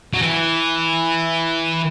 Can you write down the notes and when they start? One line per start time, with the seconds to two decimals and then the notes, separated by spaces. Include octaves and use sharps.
0.14 F#3
0.22 E3